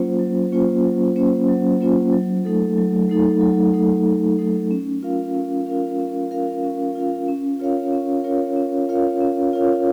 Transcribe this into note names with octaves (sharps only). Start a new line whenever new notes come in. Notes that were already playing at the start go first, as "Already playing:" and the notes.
Already playing: F#3 A#3 C#4 F4 C5
F#3
A#3 C#4 F4 C5
F#3
A#3 C#4 F4 C5
F#3
A#3 C#4 F4 C5
F#3
A3 D#4 A4
F#3
A3 D#4 A4
F#3
A3 D#4 A4
F#3
A3 D#4 A4
C#4
F4 A#4 F5
C#4
F4 A#4 F5
C#4
F4 A#4 F5
C#4
F4 A#4 F5
C#4
F4 A#4 C#5 F5
C#4
F4 A#4 C#5 F5
C#4
F4 A#4 C#5 F5
C#4
F4 A#4 C#5 F5